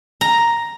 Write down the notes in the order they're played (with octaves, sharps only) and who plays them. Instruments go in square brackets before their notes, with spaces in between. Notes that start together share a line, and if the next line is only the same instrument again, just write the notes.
[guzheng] A#5